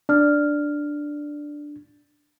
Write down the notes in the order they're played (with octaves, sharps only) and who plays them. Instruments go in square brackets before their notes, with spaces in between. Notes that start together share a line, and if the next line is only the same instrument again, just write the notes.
[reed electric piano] D4 [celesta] D5 F6